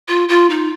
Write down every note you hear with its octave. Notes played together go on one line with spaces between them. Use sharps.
F4
F4
D#4